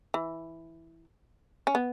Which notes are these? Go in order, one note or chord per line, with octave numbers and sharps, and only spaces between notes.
E3
C#4
B3